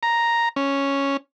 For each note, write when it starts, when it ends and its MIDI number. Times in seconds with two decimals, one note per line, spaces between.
0.03 0.49 82
0.56 1.17 61